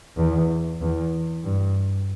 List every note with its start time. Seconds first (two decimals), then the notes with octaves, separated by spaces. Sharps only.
0.17 E2
0.80 E2
1.44 G2